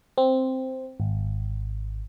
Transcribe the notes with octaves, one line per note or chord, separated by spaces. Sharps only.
C4
G#1